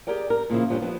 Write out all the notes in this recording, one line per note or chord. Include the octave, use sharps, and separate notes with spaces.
G4 G#4 A#4 D5 G5
A#4
A#2 C#3 F3 E4
G2 F3 C#4 D4 G4
F2 F3 B3